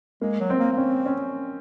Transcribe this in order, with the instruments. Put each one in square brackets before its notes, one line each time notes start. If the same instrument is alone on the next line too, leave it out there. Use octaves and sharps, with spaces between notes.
[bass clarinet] G#3 [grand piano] A#3
[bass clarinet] F#3
[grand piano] C4
[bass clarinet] A#3
A#3
[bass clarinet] C4 [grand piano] C#4
[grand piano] C#4